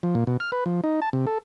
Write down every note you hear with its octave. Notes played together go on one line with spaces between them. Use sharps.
F3
A#2
B2
F6
B4
F3
D#4
A5
C3
A4